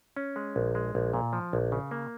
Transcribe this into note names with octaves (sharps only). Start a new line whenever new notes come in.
C#4
G#3
A#1
G#3
A#1
A#2
F3
A#1
C#3
A#3